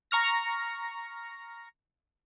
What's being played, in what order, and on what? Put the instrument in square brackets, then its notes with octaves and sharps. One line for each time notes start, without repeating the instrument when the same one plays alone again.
[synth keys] A#5 C#6 F6 A#6